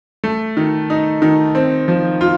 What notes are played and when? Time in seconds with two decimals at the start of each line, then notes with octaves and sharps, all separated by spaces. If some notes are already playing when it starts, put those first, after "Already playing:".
0.24 A3
0.57 D#3
0.90 D#4
1.22 D#3
1.55 C4
1.88 F3
2.21 F4